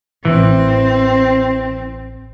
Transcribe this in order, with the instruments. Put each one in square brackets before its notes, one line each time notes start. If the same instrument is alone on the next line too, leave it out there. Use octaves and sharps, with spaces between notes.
[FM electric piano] A1 [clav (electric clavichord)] E3 [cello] C4